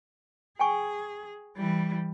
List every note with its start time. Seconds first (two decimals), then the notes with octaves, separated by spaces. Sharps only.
0.59 G#4 G5 G#5 C#6
1.57 E3 G3